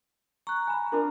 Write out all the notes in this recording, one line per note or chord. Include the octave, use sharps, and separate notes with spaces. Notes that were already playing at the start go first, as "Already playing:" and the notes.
A#5 C#6 F#6
G#5 B5
D4 F4 A#4